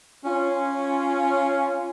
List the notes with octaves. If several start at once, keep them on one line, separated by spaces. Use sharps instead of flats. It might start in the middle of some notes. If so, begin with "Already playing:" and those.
C#4 F4